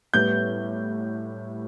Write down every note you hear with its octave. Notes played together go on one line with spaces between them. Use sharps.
A2 G3 B3 G6